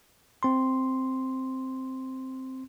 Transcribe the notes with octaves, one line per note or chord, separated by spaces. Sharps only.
C4 C6